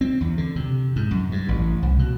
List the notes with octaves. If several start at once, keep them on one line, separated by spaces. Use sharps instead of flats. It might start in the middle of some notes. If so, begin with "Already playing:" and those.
C4
E2
D3
C3
G#2
F#2
G2
A1
C2
B2